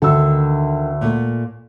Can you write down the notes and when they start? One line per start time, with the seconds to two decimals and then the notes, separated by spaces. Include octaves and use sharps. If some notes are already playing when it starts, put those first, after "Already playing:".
0.02 D2 D3 D#3 A4 E6
1.01 A#2 A3